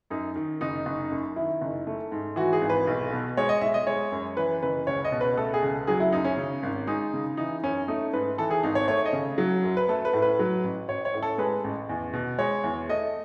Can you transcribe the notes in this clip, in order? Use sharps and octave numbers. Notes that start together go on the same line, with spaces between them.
F#2 D#4
D#3
F#1 D#4
F#1
F#2
D#3 E4
F#1
A3
G#2
E3 F#4
G#4
G#1
B4
B1
B2
G#3 C#5
D#5
B1 E5
D#5
G#3 C#5
F#2
E3 B4
F#1 B4
C#2 C#5
D#5
B2
B4
A3 A4
G#4
C#2
F#3 G#4
E4
F#2 D#4
C#4
C#3
G#1
G#3 D#4
C#3
E3 D#4
F#2 C#4
A3 D#4
G#2 B4
E3 A4
G#4
G#1 D#4
C#5
A3 C#5
D#5
C#3
F#3
F#2
B4
A3 A4
B4
A2
B4
F#3
A1
A1 C#5
C#5
A2
A4
G#3 B4
A1
E2
B2
G#3 C#5
E2
A3 D#5